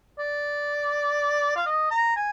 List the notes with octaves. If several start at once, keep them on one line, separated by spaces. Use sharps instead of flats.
D5
F5
D#5
A#5
G#5